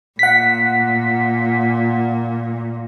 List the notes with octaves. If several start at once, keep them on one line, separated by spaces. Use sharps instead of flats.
A#2 F#5 B6